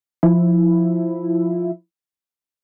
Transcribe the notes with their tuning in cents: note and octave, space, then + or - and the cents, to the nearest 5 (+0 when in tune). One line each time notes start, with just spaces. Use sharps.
F3 +0 E4 +0